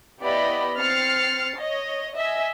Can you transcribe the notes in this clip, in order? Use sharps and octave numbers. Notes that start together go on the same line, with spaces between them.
B3 E4 G4 D5 D#5 B5
C4 F6 A6 C7 C#7
C#5 D#5
D#5 E5 G#5